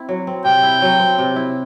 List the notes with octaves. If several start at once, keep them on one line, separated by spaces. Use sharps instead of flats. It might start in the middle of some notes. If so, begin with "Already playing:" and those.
Already playing: C4 E4
F#3
C4
C3 G5
E4
F#3
C4
C3
E4